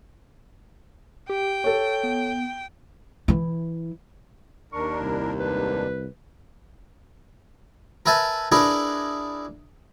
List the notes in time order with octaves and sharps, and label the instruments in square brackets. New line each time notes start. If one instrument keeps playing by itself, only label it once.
[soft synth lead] G4 [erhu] G5
[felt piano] A4 C#5
[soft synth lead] B3
[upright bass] E3 E4
[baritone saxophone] D#2 [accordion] D4 A#4 [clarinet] C#6
[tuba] C2 [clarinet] E4
[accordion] G#2 D4 [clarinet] B4
[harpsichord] A#4 B4 E5 G#5 A5
D4 E4 G#4 A#4 B4